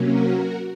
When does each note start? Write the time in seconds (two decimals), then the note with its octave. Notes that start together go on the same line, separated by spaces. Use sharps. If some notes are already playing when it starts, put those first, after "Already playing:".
Already playing: C3 F#3 A#3 C#4
0.11 F#4 A#4